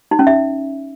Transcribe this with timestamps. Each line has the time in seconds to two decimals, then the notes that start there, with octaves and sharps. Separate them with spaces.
0.11 D#4
0.19 C#4
0.27 E5